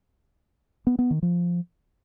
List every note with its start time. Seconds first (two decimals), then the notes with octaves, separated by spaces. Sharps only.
0.87 B3
0.99 B3
1.11 D#3
1.22 F3